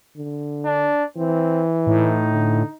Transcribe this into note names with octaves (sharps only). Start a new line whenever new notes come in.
D3
D4
E3 C4
A2 D#4
D3